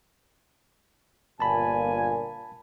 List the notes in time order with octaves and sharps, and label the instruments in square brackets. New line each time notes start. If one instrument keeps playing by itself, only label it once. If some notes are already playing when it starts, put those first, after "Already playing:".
[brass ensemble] G1 A#2 G#5 [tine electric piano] A5 B5